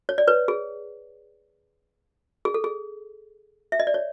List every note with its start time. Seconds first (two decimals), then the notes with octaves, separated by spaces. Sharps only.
0.09 C#5
0.18 D5
0.28 B4 C#5
0.48 G#4
2.45 G#4
2.54 A4
2.64 G#4
3.72 E5
3.80 D#5
3.87 D5
3.94 C#5